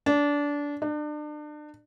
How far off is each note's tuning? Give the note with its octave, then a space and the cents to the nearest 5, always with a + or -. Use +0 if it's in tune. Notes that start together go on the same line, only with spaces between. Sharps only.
D4 -20
D4 +35